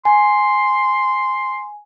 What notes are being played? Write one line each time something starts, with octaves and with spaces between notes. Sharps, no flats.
G#5 C6